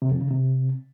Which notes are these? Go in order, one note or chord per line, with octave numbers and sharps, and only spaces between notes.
C3
F2
C#3
C3